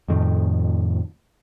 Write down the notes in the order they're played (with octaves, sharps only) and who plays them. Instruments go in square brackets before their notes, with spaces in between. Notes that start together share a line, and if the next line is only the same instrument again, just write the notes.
[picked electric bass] F2 A2 D#3